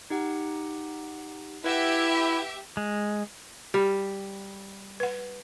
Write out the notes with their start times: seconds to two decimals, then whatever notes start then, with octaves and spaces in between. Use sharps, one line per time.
0.10 D#4 G4 F#5
1.64 E4 G4 B4 E5 F#5 A#6
2.77 G#3
3.74 G3 G4
5.00 B4 F#5